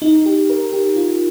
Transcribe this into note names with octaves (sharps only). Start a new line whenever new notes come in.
D#4
G4
A#4
G4
F4